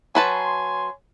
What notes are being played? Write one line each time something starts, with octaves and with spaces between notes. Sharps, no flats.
F#3 B4 C#5 G#5 A5 C6